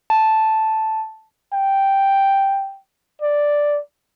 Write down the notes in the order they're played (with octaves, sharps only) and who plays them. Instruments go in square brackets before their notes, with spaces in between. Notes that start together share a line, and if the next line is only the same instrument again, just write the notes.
[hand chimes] A5
[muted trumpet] G5
D5